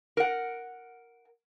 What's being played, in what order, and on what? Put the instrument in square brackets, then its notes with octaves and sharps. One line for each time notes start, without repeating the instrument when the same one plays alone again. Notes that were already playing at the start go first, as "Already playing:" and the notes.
[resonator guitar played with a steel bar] A#4 F#5